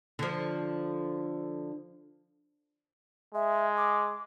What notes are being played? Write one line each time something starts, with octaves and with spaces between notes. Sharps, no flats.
D3 F3
G#3 E5
D6